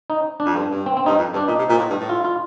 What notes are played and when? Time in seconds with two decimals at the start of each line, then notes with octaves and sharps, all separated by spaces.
0.10 D#4
0.40 D4
0.45 F2
0.56 G2
0.70 G2
0.86 C4
0.97 C4
1.06 G2 D#4
1.18 F2
1.33 G2
1.36 D4
1.48 A#2 D#4
1.58 C3
1.69 A#2
1.78 A2
1.89 G2
2.00 A2
2.09 F4
2.25 F4